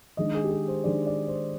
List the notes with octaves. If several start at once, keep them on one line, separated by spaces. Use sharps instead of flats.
D#3 G#3 D4 D#5
G#4
G4
G#4
C5
D#3 G#3 D4 D5
D5
C5